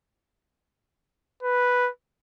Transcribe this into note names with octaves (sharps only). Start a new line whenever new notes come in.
B4